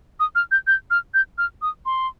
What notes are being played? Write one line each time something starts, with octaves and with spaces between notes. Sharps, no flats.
D#6
F6
G6
G6
F6
G6
F6
D#6
C6